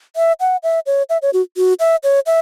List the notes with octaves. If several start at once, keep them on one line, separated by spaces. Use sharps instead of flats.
E5
F#5
E5
C#5
E5
C#5
F#4
F#4
E5
C#5
E5